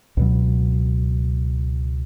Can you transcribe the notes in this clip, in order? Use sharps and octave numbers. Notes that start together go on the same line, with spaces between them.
C#2 B2 F#3